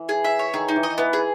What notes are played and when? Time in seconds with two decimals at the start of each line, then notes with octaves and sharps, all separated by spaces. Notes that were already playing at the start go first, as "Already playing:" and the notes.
Already playing: E3
0.09 G#4
0.24 E5
0.39 C#5
0.54 D#3 G#4
0.69 D#4
0.76 E3
0.83 D#5
0.98 E3 B3
1.13 G#4